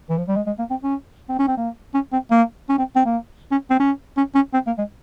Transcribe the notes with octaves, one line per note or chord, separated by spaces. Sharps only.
E3
F3
G3
G#3
G#3
A#3
C4
C#4
C4
C#4
C4
A#3
C#4
C4
A#3
C#4
C4
C4
A#3
C#4
C4
C#4
C#4
C#4
C4
A#3
G#3